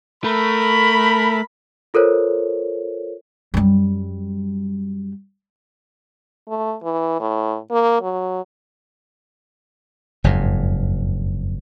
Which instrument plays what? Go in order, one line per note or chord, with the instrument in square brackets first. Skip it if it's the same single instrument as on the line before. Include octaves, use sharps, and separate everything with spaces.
[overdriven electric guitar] A3 [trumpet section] A#4 B5
[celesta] F4 A4 A#4 C5 C#5
[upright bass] F#2 G3
[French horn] A3
E3
A2
A#3
F#3
[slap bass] F#1 F2 G#2